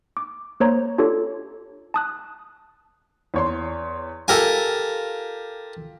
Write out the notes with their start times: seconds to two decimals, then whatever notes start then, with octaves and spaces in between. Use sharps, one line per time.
0.17 D6
0.60 A#3 C5 C#5 A#5
0.98 D4 F4 G4 A4 C#5
1.94 A5 D#6 F#6
3.34 E2 C#5 C6
4.28 F4 G4 A4 A#4 G#5